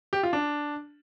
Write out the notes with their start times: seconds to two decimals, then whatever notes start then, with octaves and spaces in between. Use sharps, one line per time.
0.13 G4
0.23 F4
0.33 D4